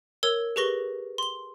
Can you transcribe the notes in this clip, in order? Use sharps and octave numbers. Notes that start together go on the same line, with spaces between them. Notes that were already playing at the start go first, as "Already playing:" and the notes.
A#4 C#5 E6 G#6
G4 G#4 B4 C#6 A#6 G7
C6 G7